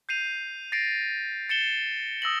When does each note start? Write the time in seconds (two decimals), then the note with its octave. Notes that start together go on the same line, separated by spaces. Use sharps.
0.09 G6 C7 D#7 F7
0.72 A6 A#6 C7 D7
1.49 A6 C#7 E7 G7
2.22 D#6 E6 A#6 F#7